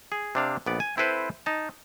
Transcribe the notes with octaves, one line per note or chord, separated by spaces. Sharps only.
G#4
C3 D4 F5
A#1 B3 D5
G#5
C4 E4 A4 B4 C5
D#4 A5